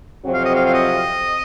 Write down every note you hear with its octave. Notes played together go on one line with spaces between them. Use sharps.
F2 C3 F#3 C4
F5
D#5
F5
F5
D#5